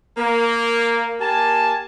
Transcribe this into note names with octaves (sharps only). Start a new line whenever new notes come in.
A#3
A#3 G4 G#5 A5